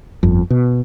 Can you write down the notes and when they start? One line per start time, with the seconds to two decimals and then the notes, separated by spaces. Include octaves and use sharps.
0.23 G1 F2
0.50 B2